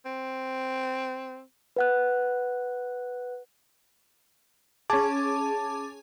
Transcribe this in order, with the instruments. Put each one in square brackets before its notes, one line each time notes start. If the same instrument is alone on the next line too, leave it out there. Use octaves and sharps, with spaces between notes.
[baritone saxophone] C4
[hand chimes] B4 F#5 F#6
[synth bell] C#4 G#4 [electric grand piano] A5 D6